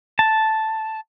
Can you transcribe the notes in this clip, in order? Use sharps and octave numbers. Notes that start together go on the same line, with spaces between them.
A5